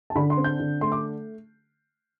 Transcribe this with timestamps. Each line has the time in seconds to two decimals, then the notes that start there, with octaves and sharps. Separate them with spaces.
0.10 A5
0.16 D3 B5
0.30 C6
0.37 C4
0.44 G6
0.60 D3
0.81 A3 C6
0.92 D6